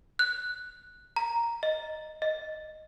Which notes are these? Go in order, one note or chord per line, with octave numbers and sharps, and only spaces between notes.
F#6
A#5
D#5
D#5